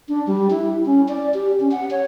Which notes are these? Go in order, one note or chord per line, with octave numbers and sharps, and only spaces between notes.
D4
G3
E4
C#4
D5
G4
C#4
F#5
C#5